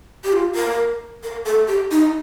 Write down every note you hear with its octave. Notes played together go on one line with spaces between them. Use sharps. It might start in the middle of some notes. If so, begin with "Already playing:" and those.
G4
F4
A#4
A#4
A4
G4
D#4